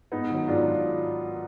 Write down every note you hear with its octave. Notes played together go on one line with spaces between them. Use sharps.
G#2 B3 D#4
D#3 F#3
G#2 D4 F4